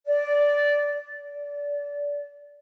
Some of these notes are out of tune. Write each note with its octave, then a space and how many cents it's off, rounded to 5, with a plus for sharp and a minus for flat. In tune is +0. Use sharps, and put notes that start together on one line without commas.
D5 -10
D5 -25